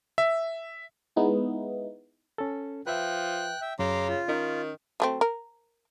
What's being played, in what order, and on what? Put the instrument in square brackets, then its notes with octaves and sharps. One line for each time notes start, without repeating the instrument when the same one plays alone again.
[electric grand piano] E5
[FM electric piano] G#3 B3 D#4 E4
[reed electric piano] C#4 A4
[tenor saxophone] F3 [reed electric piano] B4 E5 [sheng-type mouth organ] G5 F#6
[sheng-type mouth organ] E5 G5
[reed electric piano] F#2 [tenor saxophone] C#3 [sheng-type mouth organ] A#5 C6 D6
[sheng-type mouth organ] F4
[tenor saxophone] D#3 [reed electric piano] C#4 D#4
[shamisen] F#3 A3 C4
A#4